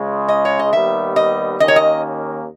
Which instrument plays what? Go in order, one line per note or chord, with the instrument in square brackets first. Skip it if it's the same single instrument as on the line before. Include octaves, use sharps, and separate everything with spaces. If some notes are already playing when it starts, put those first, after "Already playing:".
Already playing: [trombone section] C#2 C#3 G#3
[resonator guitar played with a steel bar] D#5
C#5
D#5
[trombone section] D#2 D#3 G3 B3 [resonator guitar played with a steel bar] E5
[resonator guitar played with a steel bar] D#5
[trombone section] D#2 D#3 A#3 C#4 [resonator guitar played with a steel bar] D#5
[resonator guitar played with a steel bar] C#5
D#5